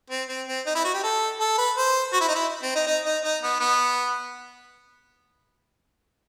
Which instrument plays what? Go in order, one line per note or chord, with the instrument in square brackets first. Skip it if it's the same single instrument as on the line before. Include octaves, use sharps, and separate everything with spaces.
[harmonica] C4
C4
C4
D#4
E4
F#4
G4
A4
A4
B4
C5
F#4
E4
D#4
E4
C4
D#4
D#4
D#4
D#4
B3
B3